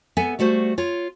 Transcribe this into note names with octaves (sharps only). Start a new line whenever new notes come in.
B3 A4 E5 G#5
G3 A3 F#4 C5
F4 C#5